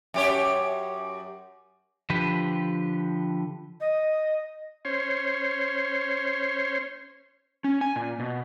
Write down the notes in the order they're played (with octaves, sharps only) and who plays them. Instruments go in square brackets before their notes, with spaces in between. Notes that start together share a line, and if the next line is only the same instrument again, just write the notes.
[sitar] F#2 G4 C#5
[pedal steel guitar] D3 F3 G4 B4
[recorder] D#5
[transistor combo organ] C#4 C5 C#5 C6
[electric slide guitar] C#4
G#5
A#2
B2